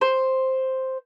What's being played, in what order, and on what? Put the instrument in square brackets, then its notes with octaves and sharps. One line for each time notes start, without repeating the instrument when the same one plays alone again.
[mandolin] C5